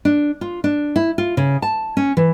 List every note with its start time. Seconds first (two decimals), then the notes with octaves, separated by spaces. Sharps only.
0.05 D4
0.41 F4
0.64 D4
0.96 E4
1.18 F4
1.37 C#3
1.62 A5
1.97 C#4
2.17 E3